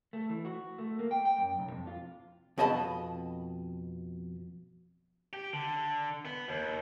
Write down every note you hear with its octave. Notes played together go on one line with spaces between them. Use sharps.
A3
E3
F#4
A3
A#3
G5
G5
F#2
B1
F2
F4
F2 B2 D#5 A5 B5
G4
D3
B3
D#2